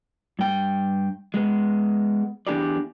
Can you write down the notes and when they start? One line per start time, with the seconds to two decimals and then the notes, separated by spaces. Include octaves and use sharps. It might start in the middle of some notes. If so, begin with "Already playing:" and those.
0.39 G2 G5
1.34 G#3 B3
2.47 E2 D4 G4 G#4 D5